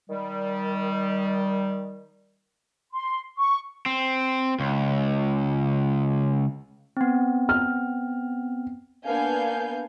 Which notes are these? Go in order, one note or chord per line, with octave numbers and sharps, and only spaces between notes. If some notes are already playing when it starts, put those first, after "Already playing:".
D#3 G3
C6
C#6
C4
C#2
B3 C4
F6
A#3 B3 D4 F5 G#5 G6